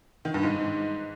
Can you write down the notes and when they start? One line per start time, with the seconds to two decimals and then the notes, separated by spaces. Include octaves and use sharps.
0.25 D#3
0.34 G2
0.43 G#2